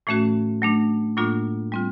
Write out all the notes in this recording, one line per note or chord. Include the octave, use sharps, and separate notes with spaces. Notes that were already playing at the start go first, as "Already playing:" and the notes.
A2 E3 A3 C#4 F#4
F#3 A3 D4
A2 F#3 A#3 D4 F4
G3 C4 F4